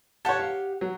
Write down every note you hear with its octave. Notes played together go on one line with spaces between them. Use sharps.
G4 C#5 F#5 A5
F5
F#3